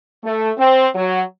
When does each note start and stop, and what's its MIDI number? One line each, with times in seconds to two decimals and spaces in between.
0.23 0.50 57
0.57 0.86 60
0.95 1.21 54